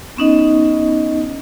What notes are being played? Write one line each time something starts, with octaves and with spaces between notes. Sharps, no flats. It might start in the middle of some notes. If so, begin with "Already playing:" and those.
B3 C#4 D#4 D#5